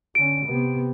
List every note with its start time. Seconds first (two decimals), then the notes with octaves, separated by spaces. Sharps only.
0.15 D3 C#4 D7
0.46 C3 B3